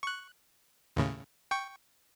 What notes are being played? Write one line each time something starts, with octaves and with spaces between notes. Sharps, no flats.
C#6 F#6
D#2 A2 C#3
G5 C#6